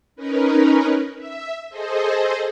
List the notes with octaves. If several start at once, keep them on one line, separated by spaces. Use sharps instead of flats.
C#4 D#4 A#4 B4
E5
G#4 A4 C5 D#5